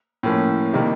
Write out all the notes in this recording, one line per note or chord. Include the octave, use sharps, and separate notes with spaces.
A2 F3 A#3 C#4
C3 D#3 G3 A#3